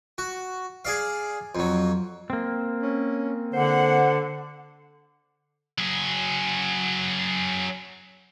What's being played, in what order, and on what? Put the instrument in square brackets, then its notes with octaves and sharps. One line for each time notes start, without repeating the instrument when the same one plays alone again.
[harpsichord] F#4
G#4 D5 F5
F2 F#3
[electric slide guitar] A#3 C4
[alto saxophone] C#4
[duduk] D3 [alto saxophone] C5 [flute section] F#5
[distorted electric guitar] F#3 G#4